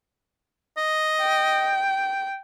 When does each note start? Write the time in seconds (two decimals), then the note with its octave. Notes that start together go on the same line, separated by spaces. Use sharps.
0.78 D#5
1.21 G5